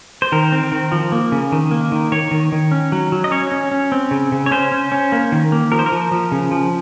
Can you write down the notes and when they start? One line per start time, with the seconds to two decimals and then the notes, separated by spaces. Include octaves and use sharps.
0.22 C5
0.32 D#3 A#4
0.52 C4
0.72 D#3
0.92 F3
1.12 A#3
1.32 C#3
1.52 D#3
1.71 A#3
1.92 D#3
2.12 D#3 C#5
2.31 D#3
2.52 D#3
2.72 C#4
2.92 F#3
3.12 F#3
3.24 D#5
3.31 C#4 C#5
3.52 C#4
3.71 C#4
3.92 C4
4.11 C#3
4.32 C#3
4.46 C#5
4.51 C#4 C5
4.72 C#4
4.92 C#4
5.12 A#3
5.32 D#3
5.52 A#3
5.72 F3 A#4
5.79 C5
5.86 A#4
5.92 F3
6.12 F3
6.32 C#3
6.51 F3